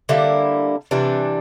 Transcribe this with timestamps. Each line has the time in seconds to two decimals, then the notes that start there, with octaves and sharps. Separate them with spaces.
0.09 D3 G3 A#3 E4
0.91 C3 E3 G3 D4